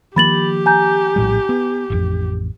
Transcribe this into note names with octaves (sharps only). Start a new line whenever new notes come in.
D#3 F3 A#3 G4 B5 A6 F#7
G#5 A#5 G6
A#1 A2 G3
B3
E1 A1 F2